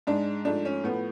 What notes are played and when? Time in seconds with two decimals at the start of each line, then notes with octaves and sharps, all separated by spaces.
0.07 G#2 G#3 D4
0.45 G#2 F3 A3 D4
0.65 C#4
0.84 A2 F3 A3 B3